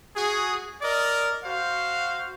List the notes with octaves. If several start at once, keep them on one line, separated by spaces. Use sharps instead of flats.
F#4 G#4
A#4 D5 D#5
F#4 C5 F5